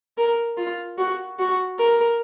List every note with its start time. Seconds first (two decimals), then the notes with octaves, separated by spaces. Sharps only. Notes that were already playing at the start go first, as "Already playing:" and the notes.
0.18 A#4
0.57 F4
0.98 F#4
1.39 F#4
1.78 A#4